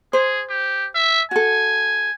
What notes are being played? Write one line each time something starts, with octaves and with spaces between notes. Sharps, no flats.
G#4 C5
G4
E5
F#4 A4 G#5